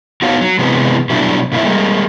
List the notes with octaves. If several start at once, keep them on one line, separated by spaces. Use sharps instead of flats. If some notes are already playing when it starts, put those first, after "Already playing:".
F#3 B3 D#4 F#4 C#5 F5
F#3
C3 E3 G#3 B3
B2 F#3 G3 A3 D4 E4
B2 A#3 E4 E5
G3 G#3 A#3